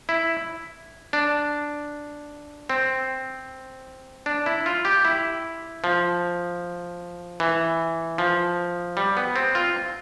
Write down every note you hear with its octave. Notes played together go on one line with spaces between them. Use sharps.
E4
D4
C4
D4
E4
F4
G4
E4
F3
E3
F3
G3
B3
C4
F4